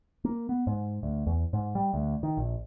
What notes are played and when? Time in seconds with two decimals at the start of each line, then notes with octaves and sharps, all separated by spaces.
0.24 A#3
0.49 B3
0.67 G#2
1.03 D2
1.27 E2
1.53 G#2
1.75 G3
1.94 D2
2.23 D#3
2.37 A#1